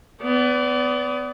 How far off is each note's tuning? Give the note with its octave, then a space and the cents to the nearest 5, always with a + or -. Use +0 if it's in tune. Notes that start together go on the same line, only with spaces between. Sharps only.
B3 +25 D5 -25